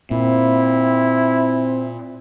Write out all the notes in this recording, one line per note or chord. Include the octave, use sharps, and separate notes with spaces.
A#2 C4 E4